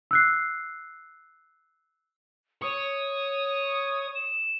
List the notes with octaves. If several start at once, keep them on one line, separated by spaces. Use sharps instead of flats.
E6 F#6 C7
C#5 D#6
E7